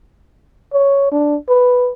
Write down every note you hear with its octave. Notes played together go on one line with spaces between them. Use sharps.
C#5
D4
B4